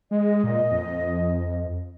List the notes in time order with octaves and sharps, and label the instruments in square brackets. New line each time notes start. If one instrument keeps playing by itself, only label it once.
[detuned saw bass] G#3 [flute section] D#5
[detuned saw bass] A#2
F2